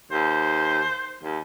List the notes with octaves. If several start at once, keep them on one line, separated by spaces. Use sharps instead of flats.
D#2 C5
D#2